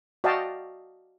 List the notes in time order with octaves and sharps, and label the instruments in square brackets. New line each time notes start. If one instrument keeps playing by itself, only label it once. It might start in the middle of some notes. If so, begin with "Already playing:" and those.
[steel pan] F#4 D5 D#5 F5 G5 A5